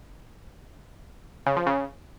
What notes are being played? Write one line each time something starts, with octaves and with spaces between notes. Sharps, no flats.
C#3
F3
C#3